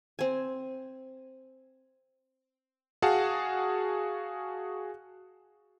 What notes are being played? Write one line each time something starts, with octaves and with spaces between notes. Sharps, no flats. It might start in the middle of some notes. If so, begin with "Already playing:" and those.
C4 G#5
F#4 G#4 F5 F#5 A5